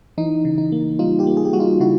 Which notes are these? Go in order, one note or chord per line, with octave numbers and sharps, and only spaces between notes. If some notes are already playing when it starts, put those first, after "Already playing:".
E3 D#4
C#3
D#4
A#3
G3 D#4 F4
F4 G4
A#3
G#4
G4
G3 F#4
D#4 F4
C#3 E4 F#4